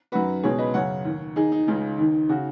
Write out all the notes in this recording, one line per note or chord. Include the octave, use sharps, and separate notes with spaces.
F#2 D#3 F#4 B4
C#2 B2 G#4 C#5
B4 D#5
F#2 C#3 C#5 F#5
D#2 D#3
D#2 D#3 D#4 G#4
D#4
C#2 C#3 D#4
D#2 D#3
C#3 F#4